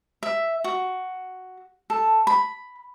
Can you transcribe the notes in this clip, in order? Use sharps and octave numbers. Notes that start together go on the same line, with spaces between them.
E5
F#4
A4
B5